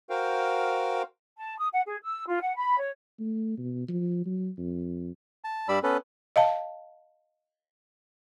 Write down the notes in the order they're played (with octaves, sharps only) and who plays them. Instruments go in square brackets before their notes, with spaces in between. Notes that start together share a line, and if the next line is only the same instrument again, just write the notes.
[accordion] F#4 A#4 C5 F5 G5
[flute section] A5
D#6
F#5
G#4
E6
F4
F#5
B5
C#5
[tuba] A3
B2
F3
F#3
F2
[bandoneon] A5
G2 G3 D5 B5 E6
B3 C#4 A4 B4
[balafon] D#5 F5 A5